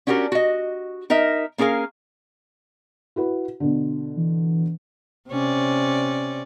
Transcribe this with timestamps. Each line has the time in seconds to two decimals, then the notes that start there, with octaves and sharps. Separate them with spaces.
0.07 C#4 D4 F#4 G4 A#4
0.32 F#4 D#5
1.10 D#4 A#4 D#5 E5
1.58 A#3 C#4 G#4 A#4 F5
3.16 E4 F#4 B4
3.60 B2 D3
4.17 E3
5.30 C3 C#4 D5